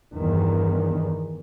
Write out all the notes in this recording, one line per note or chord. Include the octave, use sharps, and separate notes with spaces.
E2 G2 D#3